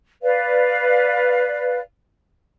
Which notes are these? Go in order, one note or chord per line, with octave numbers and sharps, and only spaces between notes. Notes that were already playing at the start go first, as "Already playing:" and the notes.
B4 D5 F5